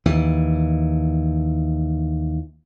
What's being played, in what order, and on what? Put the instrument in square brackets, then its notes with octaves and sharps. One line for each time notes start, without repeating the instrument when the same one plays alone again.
[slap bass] D#2 E3